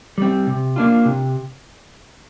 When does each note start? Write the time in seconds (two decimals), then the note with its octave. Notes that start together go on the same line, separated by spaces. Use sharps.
0.18 G3 C4
0.47 C3
0.76 A#3 D4 F4
1.05 C3